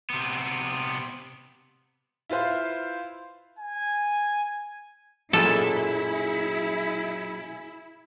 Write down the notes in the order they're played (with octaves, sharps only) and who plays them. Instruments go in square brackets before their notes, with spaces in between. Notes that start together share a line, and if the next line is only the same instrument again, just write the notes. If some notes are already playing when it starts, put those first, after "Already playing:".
[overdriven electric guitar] C3 B3
[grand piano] E4 F4 B4 C5 F5
[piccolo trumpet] G#5
[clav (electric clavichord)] B1 F#2 A#2 [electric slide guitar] F#3 G#4 [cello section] E4 [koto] A4